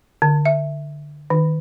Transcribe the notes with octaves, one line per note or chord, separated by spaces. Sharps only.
D3
E5
D#3